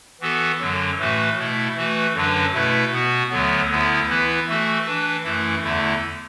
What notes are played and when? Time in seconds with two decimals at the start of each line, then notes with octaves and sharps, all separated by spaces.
0.20 E3 B3 F#4 A4
0.60 F#2 D3 F#3
0.99 A2 E3 A3 F#4 B4
1.37 B2 A3 E4
1.76 E3 A3 F#4 B4
2.14 F#2 D3 F#3 D4 B4
2.53 B2 A3 E4 B4
2.92 B2 B3 F#4
3.30 D2 D3 F#3 B3
3.70 D2 D3 B3 E4
4.08 E3 B3 E4 B4
4.47 E3 A3 F#4 A4
4.85 E3 D4 B4
5.24 F#2 E3 A3 E4
5.63 E2 D3 A3 E4